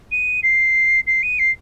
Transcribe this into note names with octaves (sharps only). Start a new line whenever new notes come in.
D#7
C7
C7
D#7
C7